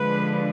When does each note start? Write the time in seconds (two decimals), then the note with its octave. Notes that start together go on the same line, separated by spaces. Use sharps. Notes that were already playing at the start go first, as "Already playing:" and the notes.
Already playing: D3 F3 G#3 D4 B4